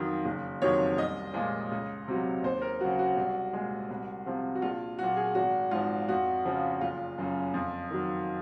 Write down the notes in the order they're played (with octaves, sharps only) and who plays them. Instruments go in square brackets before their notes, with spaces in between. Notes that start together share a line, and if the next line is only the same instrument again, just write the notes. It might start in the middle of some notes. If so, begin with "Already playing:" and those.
Already playing: [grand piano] F2 D#3 F#3
F#1
F2 C3 D#3 F#3 C#5
C2 D#5
A#2 F3 G#3
C#2
C3 F#3
D#2 C5
A#4
C#3 F#3 F#4
F#4
C2
A#2 G#3
C2
C3 F3
F#4
A#1 F4
A#2 F#3 F#4
G#4
G#1 F#4
G#2 F3 F4
F2 F#4
C#3 F3
F#1 F4
F#2 C#3
F2
D#3 F#3